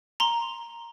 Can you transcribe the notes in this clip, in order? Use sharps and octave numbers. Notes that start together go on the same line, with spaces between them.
A#5 C6